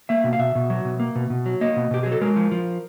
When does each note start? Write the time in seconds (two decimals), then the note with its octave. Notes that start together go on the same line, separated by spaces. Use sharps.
0.09 A#3 E5
0.24 B2
0.33 F5
0.39 B2 E5
0.55 B2
0.70 F#3
0.85 B2
1.00 A#3
1.15 B2
1.30 B2
1.46 F#3
1.61 A#3 D#5
1.76 B2
1.91 B2 G4
2.03 F#3 G#4
2.12 A4
2.21 G#3 A#4
2.36 F3
2.51 F3